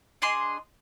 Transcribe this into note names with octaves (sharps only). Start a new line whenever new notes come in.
D4 G#4 D#5 C6